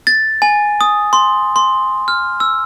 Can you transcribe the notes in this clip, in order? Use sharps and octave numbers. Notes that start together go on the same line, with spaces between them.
A6
G#5
D#6
C6
C6
F6
E6